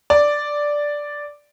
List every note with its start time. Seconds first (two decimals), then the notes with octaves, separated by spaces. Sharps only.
0.10 D5